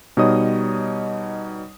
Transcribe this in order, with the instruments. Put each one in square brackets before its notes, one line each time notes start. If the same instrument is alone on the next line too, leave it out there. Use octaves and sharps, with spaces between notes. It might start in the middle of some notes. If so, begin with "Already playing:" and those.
[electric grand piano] B2 G3 D#4 C#5 D#5 D#6